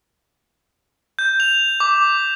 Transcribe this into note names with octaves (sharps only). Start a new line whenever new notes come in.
G6
F7
D6